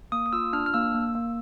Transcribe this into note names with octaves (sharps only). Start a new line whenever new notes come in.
A#3 D#6
D#6
F4 E6
D4 F6
F6
A#3 E6
A#3
A#3